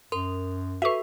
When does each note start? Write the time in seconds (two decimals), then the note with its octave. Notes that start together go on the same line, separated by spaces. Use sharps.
0.12 F#2 A#4 C6
0.82 F#4 A4 B4 E5 C#6